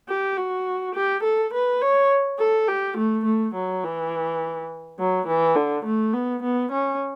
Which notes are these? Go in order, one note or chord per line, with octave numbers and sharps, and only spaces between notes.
G4
F#4
G4
A4
B4
C#5
A4
G4
A3
A3
F#3
E3
F#3
E3
D3
A3
B3
B3
C#4